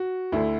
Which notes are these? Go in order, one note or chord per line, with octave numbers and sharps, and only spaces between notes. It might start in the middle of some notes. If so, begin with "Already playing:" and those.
Already playing: F#4
D2 D3 E4